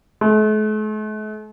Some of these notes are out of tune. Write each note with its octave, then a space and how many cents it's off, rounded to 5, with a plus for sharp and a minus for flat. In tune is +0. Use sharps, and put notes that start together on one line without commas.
A3 -45